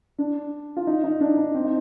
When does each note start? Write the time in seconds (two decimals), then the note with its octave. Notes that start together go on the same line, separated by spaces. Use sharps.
0.18 D4
0.77 F4
0.87 D#4
1.04 D#4
1.21 D4
1.37 D#4
1.54 C4
1.64 D#4